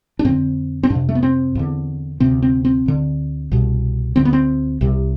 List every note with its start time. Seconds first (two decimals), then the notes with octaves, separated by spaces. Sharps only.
0.19 D4
0.24 F2 D3 C4
0.83 C4
0.90 F2 D4
0.95 C3
1.09 A3
1.15 B3
1.23 C4
1.55 E2 D3
2.20 D2 C3 C4
2.42 C4
2.65 C4
2.86 D2 D3
3.51 C2 B2
4.16 D2 D3 C4
4.25 B3
4.33 C4
4.81 C2 C3